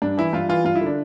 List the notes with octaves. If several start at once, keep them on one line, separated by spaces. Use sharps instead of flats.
G2 D4
E3 E4
G2 F4
E3 F4
G2 F4
E4
D3 D4